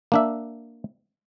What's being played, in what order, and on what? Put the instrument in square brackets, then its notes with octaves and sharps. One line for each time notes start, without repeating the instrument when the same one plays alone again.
[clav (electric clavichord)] A#3 D4 E5